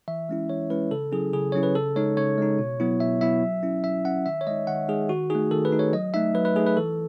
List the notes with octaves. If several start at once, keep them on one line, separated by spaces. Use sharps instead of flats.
E3 E5
G#3 C#4 E4
E3 C#5
G#3 C#4 E4 B4
C#3 A4
F#3 C#4 E4 G#4
C#3 G#4
F#3 C#4 E4 C#5
B4
C#3 A4
G#3 D#4 C#5
C#3 C#5
G#3 D#4
B2
F#3 B3 E4
B2 E5
F#3 B3 E4 E5
F#3
C#4 E4
F#3 E5
C#4 E4 F#5
D#3 E5
C#5
G#3 D#4 D#5
D#3 F#5
G#3 D#4 G#4
D#3 F#4
A3 D#4 G#4
D#3 A4
B4
A3 D#4
C#5
F#3 D#5
A3 D#4 E5
F#3 B4
B4
A3 D#4 G#4
B4
E3 A4